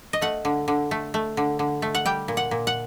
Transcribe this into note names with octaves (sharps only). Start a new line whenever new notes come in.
D#5
A3 F#5
D3
D3
A3
A3
D3
D3
A3
F#5
G3 G5
A#2
F#5
A#2
F#5